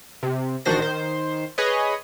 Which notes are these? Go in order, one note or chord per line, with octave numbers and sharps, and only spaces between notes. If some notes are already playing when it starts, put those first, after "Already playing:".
C3
A#1 D#3 D4 F#4 C5 A#6
D#3 C5
G#4 B4 C#5 D#5